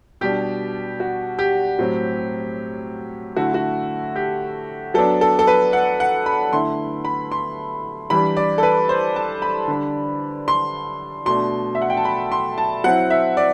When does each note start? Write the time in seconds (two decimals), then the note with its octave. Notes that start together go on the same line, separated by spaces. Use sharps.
0.21 B2 G3 D4 G4
1.00 F#4
1.39 G4
1.79 A2 F#3 C4
3.36 D3 A3 E4 F#4
3.54 F#4
4.16 G4
4.94 F#3 B3 D4 A4
5.21 A4
5.39 A4
5.47 B4
5.73 F#5
6.00 F#5
6.26 B5
6.53 D3 A3 E4 C6
7.05 B5
7.32 C6
8.10 E3 G3 D4 B5
8.37 D5
8.58 A4
8.63 B4
8.89 C5
9.16 A5
9.42 B5
9.68 D3 G3 D4
10.48 C6
11.26 B2 A3 D4 C6
11.75 E5
11.82 F#5
11.90 G5
11.97 A5
12.05 B5
12.32 C6
12.58 A5
12.84 F#3 C4 E4 F#5
13.10 E5
13.37 D5